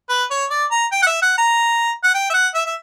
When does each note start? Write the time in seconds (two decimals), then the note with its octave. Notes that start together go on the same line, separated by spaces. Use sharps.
0.09 B4
0.31 C#5
0.50 D5
0.71 A#5
0.92 G5
1.03 F#5
1.07 E5
1.22 F#5
1.38 A#5
2.04 F#5
2.14 G5
2.30 E5
2.34 F#5
2.55 E5
2.66 E5